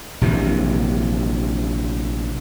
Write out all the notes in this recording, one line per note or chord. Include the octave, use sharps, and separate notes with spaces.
A#1 C3 E3